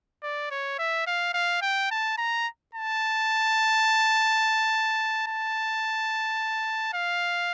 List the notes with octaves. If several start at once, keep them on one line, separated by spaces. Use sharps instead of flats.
D5
C#5
E5
F5
F5
G5
A5
A#5
A5
A5
F5